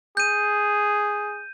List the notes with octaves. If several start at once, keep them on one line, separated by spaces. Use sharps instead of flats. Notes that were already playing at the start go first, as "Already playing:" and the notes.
G#4 G6 D#7